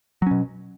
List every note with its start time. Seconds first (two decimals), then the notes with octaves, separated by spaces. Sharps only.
0.22 F#3
0.27 C#4
0.31 B2